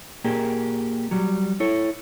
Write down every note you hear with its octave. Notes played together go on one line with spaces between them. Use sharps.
A#2 A#3 G4 G#4 A#4
F#3 G3
E4 A4 C#5